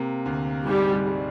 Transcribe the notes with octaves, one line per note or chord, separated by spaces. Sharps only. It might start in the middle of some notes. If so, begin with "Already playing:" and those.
Already playing: C3 A#3
D2
G#2 G3
G3